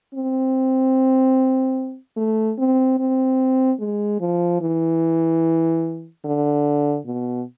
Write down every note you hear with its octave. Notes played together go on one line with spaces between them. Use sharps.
C4
A3
C4
C4
G#3
F3
E3
D3
B2